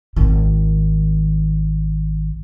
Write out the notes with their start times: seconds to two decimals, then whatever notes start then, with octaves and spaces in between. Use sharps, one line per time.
0.16 G#1 D#3